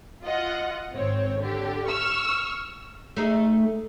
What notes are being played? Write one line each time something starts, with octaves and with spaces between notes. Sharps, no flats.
F4 D#5 F#5
G#1 C4 C#5
D3 G4
C#6 E6 F6
A3 D#4 G#4